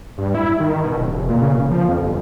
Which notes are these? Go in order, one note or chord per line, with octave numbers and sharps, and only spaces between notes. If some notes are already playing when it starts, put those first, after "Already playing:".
G2
E4
D#3
B2
D1
F1
A#2
C#3
E1
F3
F2
G1